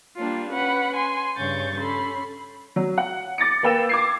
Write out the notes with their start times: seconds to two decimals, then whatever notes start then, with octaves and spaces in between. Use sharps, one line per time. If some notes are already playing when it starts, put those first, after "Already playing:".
0.16 G3 A#3 D4 F4
0.51 C#4 B4 F#5 B5
0.96 G#5 C6
1.36 G2 C#3 C#5 C#6 G6 A6
1.77 C#4 A4 B5 C6
2.76 F#3
2.98 F#5
3.38 D6 A6 A#6 C#7
3.63 A#3 B4 G5 E6 E7
3.89 D6 G#6 C7